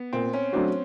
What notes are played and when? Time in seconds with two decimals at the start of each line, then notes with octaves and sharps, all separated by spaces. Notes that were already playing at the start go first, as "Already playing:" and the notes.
Already playing: B3
0.13 A#2 C4
0.34 C#4
0.53 F#3 A3 C4 D4 F#4